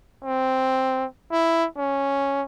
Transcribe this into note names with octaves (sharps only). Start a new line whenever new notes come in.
C4
E4
C#4